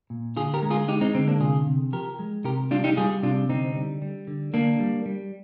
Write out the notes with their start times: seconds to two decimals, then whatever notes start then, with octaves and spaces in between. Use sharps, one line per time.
0.10 A#2
0.36 D3 F4 G#4
0.53 G4 A#4
0.62 G#3
0.71 F4 G#4
0.88 G#3 D#4 G4
1.01 C4 D#4
1.15 D3 C4
1.28 A#3 D4
1.40 C3 F4 G#4
1.66 C3
1.92 F3 G4 A#4
2.19 G#3
2.44 C3 G4 A#4
2.71 G3 D4 F4
2.84 D#4 G4
2.97 G3 F4 G#4
3.23 C3 D4 F4
3.49 D3 C4 D#4
3.76 G3
4.02 G3
4.27 D3
4.53 D3 A#3 D4
4.80 G3
5.06 G3